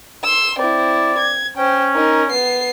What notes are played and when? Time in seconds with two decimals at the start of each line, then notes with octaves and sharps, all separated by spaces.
0.24 C6 E6
0.59 C4 E4 D5
1.19 G#6
1.58 C#4 C5 G5
1.95 D#4 A#4
2.31 B3 C7